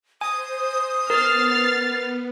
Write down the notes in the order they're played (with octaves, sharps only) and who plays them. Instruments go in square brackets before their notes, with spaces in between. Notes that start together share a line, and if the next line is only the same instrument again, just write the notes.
[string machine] C5 [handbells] G#5 [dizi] D#6
[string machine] B3 [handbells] A#4 [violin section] F6 A6 C7